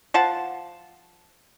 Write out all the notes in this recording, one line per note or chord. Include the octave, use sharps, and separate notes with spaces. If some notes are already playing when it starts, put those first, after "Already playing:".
F3 F#5 A5